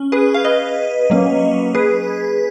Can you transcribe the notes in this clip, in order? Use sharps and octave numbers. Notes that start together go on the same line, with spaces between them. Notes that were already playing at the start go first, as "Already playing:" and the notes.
Already playing: C#4
G#4 B4
F5
B4 D#5
F#3 A#3 C#4
G#4 B4